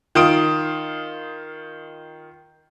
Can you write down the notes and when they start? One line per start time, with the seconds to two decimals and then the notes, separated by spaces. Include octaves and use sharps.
0.15 D#3 F4 D#6 D7